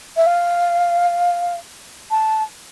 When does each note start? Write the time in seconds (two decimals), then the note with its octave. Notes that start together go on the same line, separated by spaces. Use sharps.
0.17 E5
0.26 F5
2.11 A5